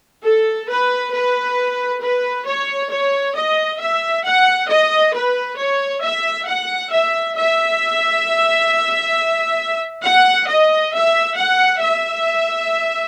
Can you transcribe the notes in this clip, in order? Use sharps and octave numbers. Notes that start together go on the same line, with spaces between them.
A4
B4
B4
B4
C#5
C#5
D#5
E5
F#5
D#5
B4
C#5
E5
F#5
E5
E5
F#5
D#5
E5
F#5
E5